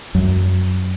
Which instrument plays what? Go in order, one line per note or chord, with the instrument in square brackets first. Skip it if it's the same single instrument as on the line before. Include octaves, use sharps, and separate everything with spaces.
[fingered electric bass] F#2